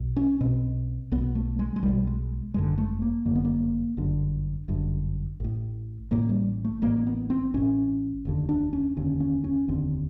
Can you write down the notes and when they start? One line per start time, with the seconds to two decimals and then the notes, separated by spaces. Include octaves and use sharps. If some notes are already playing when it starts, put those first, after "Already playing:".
Already playing: B1 B2
0.16 C#4
0.41 B1 B2 C4
1.12 B1 B2 B3
1.35 A3
1.59 G#3
1.76 G#3
1.83 B1 G3
1.88 B2
2.07 G#3
2.54 G1 F#2 D3 G#3
2.78 A3
3.02 A#3
3.26 G1 F#2 D3 A#3
3.35 B3
3.45 A#3
3.97 G1 F#2 D3
4.68 G1 F#2 D3
5.40 A1 A2
6.11 A1 A2 A#3
6.29 G3
6.65 A3
6.82 A1 A2 A#3
7.07 B3
7.30 C4
7.54 A1 A2 C#4
8.25 F1 D#2 D3
8.49 D4
8.73 C#4
8.97 F1 D#2 D3 C#4
9.20 C#4
9.44 C#4
9.68 F1 D#2 D3 C4